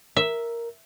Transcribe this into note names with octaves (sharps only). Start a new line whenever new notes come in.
A#4 E5